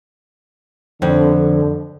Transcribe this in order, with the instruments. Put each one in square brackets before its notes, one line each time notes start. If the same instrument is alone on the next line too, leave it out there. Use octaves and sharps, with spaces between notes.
[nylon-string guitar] F2 [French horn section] D3